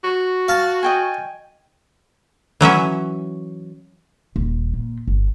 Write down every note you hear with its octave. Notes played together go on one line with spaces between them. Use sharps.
F#4
F5 A5
D#5 G5 G#5
E3 F#3 C#4 E5
D#1
A#2
G1